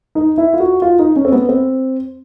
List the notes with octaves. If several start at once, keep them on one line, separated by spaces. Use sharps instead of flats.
D#4
E4
F4
F#4
F4
D#4
C#4
C4
B3
C4